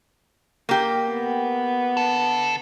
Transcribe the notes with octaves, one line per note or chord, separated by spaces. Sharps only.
A#3 G4
B3
D3 A4